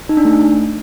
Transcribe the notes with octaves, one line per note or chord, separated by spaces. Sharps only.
D#4
D4
A3